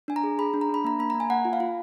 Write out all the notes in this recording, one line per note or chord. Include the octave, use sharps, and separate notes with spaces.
D4 G#5
A#5
G#4
G#4 B5
D4
A#5
D4 B5
A#3 A#5
A#3 B5
A#3 A#5
G#5
A#3 F#5
F4
F5
F4